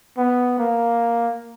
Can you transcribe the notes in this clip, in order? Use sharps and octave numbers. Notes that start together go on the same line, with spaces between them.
B3
A#3